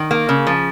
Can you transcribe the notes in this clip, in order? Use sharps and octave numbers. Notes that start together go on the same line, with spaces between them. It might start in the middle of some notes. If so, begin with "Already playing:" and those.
Already playing: D#3
A#3
C#3
F3